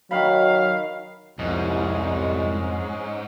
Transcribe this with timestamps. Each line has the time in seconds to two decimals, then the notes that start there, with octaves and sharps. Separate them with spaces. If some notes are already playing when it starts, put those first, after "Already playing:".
0.11 D#3 F#3 D#4 F5 B5
1.39 C2 F2 G#2 C#4 D#5